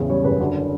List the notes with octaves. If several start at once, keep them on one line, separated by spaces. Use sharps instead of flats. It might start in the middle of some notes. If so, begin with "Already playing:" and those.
Already playing: A1 E2 C#3
G3 C#5
F#1 B4
D3 F#4